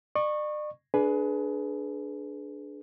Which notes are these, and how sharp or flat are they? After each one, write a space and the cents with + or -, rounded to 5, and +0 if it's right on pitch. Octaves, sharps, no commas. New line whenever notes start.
D5 +40 C#6 -10
D4 +0 G#4 +25 B4 +0